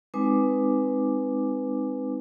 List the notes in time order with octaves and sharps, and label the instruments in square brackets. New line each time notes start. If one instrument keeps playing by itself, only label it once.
[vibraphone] G#3 C4 D#4 B4 G#5 D6